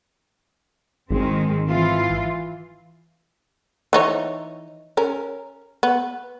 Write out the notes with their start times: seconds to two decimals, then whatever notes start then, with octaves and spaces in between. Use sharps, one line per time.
1.11 G#1 D#3 G#3 C4
1.67 E3 F4
3.93 E3 D#4 C#5
4.97 C#4 A#4
5.83 B3